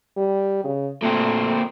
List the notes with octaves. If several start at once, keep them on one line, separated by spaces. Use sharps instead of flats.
G3
C#3
A#2 A3 C4